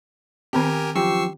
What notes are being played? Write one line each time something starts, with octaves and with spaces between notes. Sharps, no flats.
D#3 B3 C4 G4 A#4 G#5
F#2 F3 G4 C#6 E6 C7